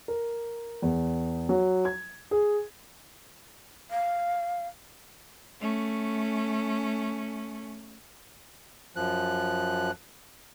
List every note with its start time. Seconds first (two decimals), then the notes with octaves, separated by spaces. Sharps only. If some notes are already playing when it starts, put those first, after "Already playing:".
0.08 A#4
0.82 E2
1.49 F#3
1.85 G#6
2.31 G#4
3.91 F5
5.60 A3 C#4
8.96 F#2 F3 F#6